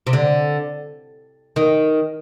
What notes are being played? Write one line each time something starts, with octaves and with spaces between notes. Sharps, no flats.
C3
D3
D#3